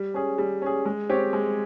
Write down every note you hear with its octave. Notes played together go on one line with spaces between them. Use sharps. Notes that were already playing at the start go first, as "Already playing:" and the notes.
Already playing: G3
C#4 G#4
G3
C#4 G#4
G#3
C4 G4 C#5
G#3